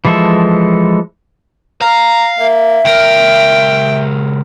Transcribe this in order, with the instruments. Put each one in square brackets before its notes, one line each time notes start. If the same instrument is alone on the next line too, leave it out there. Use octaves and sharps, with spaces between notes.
[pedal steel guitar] E3 F3 G#3 A4 E5
[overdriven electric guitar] F5 [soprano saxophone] A#5
[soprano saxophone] A#3 [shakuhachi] E5
[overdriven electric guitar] C#2 A#4 [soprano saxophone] G5